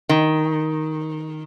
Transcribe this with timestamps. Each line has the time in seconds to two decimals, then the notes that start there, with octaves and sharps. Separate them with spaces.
0.09 D#3